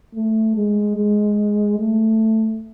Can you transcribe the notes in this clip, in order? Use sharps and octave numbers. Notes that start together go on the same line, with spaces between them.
A3
G#3
G#3
A3